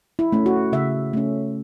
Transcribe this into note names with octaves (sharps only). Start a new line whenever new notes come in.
E4
A3 C#4
F#4
C#3 E5
A3 C#4